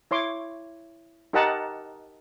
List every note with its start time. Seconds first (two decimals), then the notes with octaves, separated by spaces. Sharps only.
0.11 E4 C#5 C6 D6
1.33 D#4 G4 A#4 D#5 F#5 A5